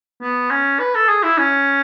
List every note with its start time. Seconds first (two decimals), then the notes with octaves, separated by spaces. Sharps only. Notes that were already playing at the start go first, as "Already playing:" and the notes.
0.22 B3
0.51 C#4
0.80 B4
0.95 A4
1.09 G#4
1.23 E4
1.38 C#4